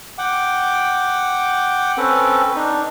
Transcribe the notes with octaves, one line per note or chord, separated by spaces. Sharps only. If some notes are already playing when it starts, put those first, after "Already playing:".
F#5 G5 D6
C4 C#4 A4 B4
D4 D#4